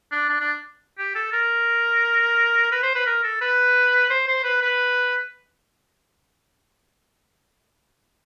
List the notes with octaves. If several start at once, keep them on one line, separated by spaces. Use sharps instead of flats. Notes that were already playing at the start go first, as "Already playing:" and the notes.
D4
D4
D4
G4
A4
A#4
B4
C5
B4
A#4
A4
B4
C5
C5
B4
B4